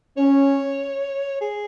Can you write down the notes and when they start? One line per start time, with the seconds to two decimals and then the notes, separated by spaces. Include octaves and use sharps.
0.18 C#4 C#5
1.41 G#4